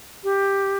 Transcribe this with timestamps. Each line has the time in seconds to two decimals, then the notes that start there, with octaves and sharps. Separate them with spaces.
0.24 G4